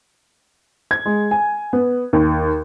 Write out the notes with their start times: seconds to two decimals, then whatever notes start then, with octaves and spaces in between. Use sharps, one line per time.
0.91 G#6
1.06 G#3
1.31 G#5
1.73 B3
2.13 D#2